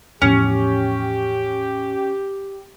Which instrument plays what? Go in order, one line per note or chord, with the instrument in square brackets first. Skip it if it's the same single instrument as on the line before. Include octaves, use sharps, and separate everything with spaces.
[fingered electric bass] E2 A2 F3 [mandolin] C#4 [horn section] G4